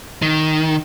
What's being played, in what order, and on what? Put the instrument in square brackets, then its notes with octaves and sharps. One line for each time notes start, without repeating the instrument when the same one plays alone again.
[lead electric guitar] D#3